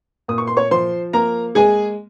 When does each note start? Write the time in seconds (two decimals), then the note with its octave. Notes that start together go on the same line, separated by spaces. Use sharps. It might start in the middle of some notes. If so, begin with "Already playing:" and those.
0.28 A#2 D#6
0.38 C#6
0.47 C6
0.57 C#5 C#6
0.71 F3 C5 C6
1.13 A#3 A#4 A#5
1.55 G#3 G#4 G#5